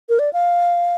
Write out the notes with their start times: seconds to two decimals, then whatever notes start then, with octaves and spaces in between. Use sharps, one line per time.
0.09 A#4
0.19 D5
0.33 F5